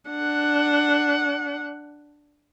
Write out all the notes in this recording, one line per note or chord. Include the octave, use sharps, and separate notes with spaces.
D4 F#5